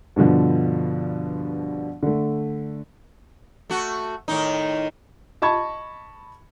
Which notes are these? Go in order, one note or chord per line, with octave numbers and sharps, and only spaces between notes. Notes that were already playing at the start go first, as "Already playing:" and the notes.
G2 B2 D3 F3
D3 A3
A3 F#4
A2 D#3 D#4
D#5 A5 B5 C#6 G#6